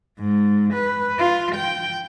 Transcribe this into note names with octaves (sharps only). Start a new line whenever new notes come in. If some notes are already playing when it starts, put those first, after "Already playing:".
G#2
B4
F4
G5